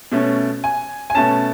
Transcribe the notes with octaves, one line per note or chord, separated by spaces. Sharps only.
B2 A3 C#4
G#5
G#5
B2 A3 C#4 A5